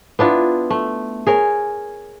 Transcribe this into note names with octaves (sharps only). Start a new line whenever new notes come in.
B3 D4 E4 F4
A3
G#4 A#4 C#5